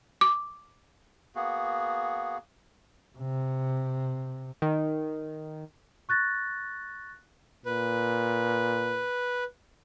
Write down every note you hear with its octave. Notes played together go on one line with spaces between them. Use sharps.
D6
A#3 B3 F#4 G#4
C3
D#3
C#6 F#6 A6 A#6
A#2 B4